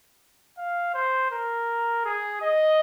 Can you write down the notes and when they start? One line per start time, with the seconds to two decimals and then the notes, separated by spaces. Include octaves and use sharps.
0.58 F5
0.94 C5
1.31 A#4
2.05 G#4
2.42 D#5